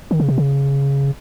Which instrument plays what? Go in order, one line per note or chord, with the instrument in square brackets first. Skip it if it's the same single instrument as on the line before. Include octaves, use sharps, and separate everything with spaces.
[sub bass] D#3
C#3
C3
C#3